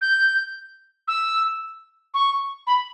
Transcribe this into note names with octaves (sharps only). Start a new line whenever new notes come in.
G6
E6
C#6
B5